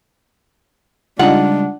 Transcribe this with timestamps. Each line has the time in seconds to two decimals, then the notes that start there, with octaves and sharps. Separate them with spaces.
1.19 C#3 G3 G#3 D4 D#4 F4 F#5